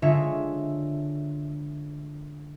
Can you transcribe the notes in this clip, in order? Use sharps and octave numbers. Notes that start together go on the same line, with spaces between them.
D3 G#3 F4 C#5 E5